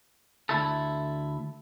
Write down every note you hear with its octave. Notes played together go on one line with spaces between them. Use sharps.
D2 E4 A4